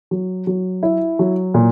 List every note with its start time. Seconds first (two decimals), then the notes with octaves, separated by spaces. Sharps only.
0.11 F#3
0.47 F#3
0.83 E4
1.19 F#3
1.54 A#2